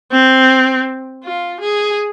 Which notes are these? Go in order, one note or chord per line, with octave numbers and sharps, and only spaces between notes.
C4
F4
G#4